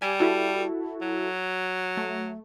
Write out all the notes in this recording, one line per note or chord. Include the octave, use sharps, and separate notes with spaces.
G3 G4 G#5
E4 F#4 A4
F#3
A3